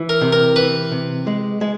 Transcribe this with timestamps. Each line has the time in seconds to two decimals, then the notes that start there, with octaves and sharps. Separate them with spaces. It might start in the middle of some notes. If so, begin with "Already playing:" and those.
Already playing: E3
0.09 A#4
0.21 C3
0.33 A#4
0.56 E3 B4
0.91 C3
1.27 G#3
1.61 G#3